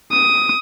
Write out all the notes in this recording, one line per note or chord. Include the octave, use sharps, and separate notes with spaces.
D#6